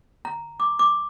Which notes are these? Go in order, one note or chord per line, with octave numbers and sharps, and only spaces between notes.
A#5
D6
D6